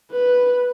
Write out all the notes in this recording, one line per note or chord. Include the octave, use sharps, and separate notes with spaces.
B4